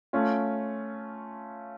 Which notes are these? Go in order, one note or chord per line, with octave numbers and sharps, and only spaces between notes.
A3 C#4 F4